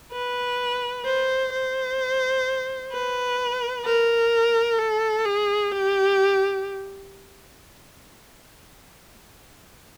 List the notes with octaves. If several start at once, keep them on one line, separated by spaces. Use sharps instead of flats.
B4
C5
C5
B4
A#4
A4
G#4
G4